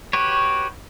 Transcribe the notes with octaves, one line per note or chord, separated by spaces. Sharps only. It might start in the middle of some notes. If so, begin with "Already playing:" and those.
F#4 G4 B4 C#5